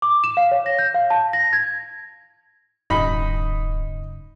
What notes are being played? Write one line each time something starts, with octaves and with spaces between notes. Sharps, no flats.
D6
E7
F5
C#5
A#6
G6
F5
A5
A#6
G#6
D1 F#2 C#3 D#4 B5